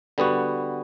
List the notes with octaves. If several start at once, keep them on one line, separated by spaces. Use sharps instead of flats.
D3 G3 B3 F#4